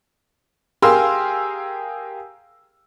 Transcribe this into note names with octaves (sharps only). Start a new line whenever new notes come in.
G4 G#4 A#4 F5 C6 E6